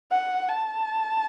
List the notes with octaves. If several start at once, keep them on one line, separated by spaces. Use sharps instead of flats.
F#5
A5